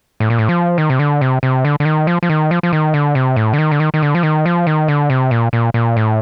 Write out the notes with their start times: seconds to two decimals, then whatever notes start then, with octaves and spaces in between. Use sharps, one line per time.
0.20 A2
0.30 A#2
0.39 A2
0.49 F3
0.78 D#3
0.90 C3
0.99 D3
1.21 C3
1.43 C3
1.65 D3
1.80 D3
1.85 D#3
2.07 F3
2.23 F3
2.29 D#3
2.51 F3
2.63 F3
2.73 D#3
2.94 D3
3.15 C3
3.36 A2
3.53 D3
3.59 D#3
3.71 D3
3.80 D#3
3.94 D#3
4.02 D3
4.15 F3
4.23 D#3
4.46 F3
4.67 D#3
4.88 D3
5.10 C3
5.31 A#2
5.53 A#2
5.74 A#2
5.96 A2